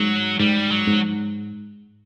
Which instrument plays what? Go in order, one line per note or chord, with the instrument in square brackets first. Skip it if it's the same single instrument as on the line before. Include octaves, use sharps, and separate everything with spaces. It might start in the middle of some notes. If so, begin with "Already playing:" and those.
Already playing: [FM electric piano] G#2 [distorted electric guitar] F#3
[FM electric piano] G#2 [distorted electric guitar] G3
[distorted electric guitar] F#3
[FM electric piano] G#2